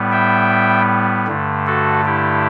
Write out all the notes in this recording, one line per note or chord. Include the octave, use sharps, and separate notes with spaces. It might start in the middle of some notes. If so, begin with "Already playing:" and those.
Already playing: A2 G3 B3
E5 G5
G2 D3 A3
F#4 A4
E4 G4